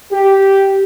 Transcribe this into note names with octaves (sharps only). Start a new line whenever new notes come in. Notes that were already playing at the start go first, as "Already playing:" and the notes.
G4